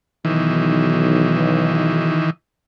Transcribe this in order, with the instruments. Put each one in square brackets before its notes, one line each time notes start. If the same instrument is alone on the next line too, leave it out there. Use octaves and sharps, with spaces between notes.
[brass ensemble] B1 [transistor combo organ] D#3 E3